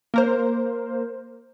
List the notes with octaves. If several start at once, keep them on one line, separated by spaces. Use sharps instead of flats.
A#3 A#4 C5